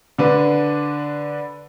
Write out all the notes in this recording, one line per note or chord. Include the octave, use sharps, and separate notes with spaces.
D3 D4 B4